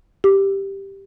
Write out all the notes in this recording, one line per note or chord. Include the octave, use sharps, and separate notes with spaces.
G4